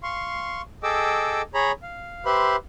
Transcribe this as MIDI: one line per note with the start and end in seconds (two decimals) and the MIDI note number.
0.03 0.62 77
0.03 0.62 84
0.03 0.62 85
0.83 1.42 68
0.83 1.42 69
0.83 1.42 75
0.83 1.42 79
0.83 1.42 86
0.83 1.42 88
1.54 1.72 68
1.54 1.72 73
1.54 1.72 82
1.54 1.72 83
1.83 2.25 77
2.25 2.56 67
2.25 2.56 71
2.25 2.56 72
2.25 2.56 76
2.25 2.56 83
2.25 2.56 84